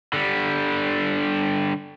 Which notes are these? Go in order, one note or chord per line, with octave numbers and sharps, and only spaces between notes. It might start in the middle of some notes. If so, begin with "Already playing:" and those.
D3 G3